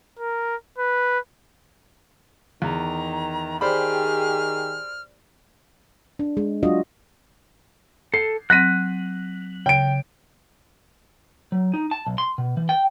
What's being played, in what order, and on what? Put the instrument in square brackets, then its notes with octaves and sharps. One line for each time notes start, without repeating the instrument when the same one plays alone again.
[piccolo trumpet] A#4
B4
[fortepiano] E2 [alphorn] D#3 [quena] A#5
[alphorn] D#3 [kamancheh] G4 G#4 [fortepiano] C5 D5 B5 [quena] F6
[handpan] D4
G#3
F#3 D4 F4 F#4 D#5
[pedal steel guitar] A4 [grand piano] C7
[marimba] F#3 C4 [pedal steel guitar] F#6 [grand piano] A#6 B6 D#7
[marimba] C#3 [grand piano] G5 D7
[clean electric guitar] F#3
D#4
A5
B1
C6
B2
E3
G5